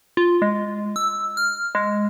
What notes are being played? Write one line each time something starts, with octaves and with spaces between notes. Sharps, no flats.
F4
G#3
E6
F6
G#3